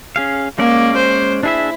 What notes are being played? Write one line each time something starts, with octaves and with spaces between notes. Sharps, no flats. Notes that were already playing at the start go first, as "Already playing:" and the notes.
C#4 G#4 F5
G#3 A#3 C#4 D5
C5
D4 E4 G#4 E5